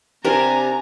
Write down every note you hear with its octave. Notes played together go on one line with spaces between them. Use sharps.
C3 D4 G4 A#4 G#5 A#5